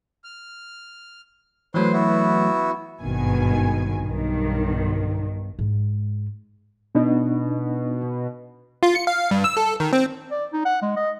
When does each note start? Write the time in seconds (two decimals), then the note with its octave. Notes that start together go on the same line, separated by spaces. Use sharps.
0.24 F6
1.74 E3 F#3 A3 B4 C5 C6
1.93 B3 E4 F#4
3.02 G#1 G2 B2 D#3 G#5
4.03 B1 G2 D#3
5.59 G#2 G#3
6.95 B2 B3 D4 D#4
8.83 F4
8.95 C#7
9.07 F5
9.31 G2
9.44 E6
9.57 A4
9.80 D#3
9.93 C4
10.31 D5
10.53 D#4
10.65 F#5
10.82 G#3
10.97 D#5